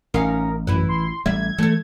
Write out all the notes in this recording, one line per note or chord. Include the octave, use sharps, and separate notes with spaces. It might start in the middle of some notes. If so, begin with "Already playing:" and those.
A1 C#4 D#4 A#4 F5
F#2 E3 E4 B4
C6
A1 G3 A3 E5 G#6
E3 A3 A4